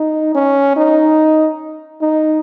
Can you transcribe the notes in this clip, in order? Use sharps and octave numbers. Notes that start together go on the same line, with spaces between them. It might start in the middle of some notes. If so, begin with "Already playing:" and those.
Already playing: D#4
C#4
D#4
D#4